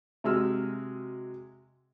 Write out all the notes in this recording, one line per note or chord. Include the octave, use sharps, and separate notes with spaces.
C3 F#3 G#3 E6 F6